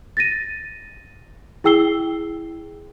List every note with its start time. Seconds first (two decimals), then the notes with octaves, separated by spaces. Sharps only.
0.17 A6 A#6 D#7
1.64 E4 G#4 G5 E6 C7 G7